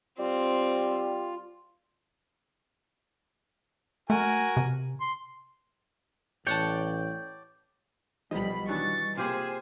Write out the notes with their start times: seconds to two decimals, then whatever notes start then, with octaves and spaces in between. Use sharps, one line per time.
0.19 G3 C4 F4
4.10 A3 F#4 A#4 G#5
4.57 C3
5.01 C6
6.47 A1 C#5 D5 F#5 G5 A5
8.31 B1 B2 F3 G3 D#5 B5
8.69 D#3 E3 F#3 D4 C#6 A6
9.17 C3 A#3 F4 G4 G#4 C5 G#5